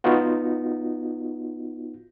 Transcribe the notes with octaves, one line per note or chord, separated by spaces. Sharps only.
B3 D#4 F4 F#4